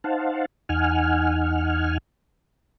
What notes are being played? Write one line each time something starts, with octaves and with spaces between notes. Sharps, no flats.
D#4 C5 F5 F#5 A5
E2 D#4 F#5 G#5 F6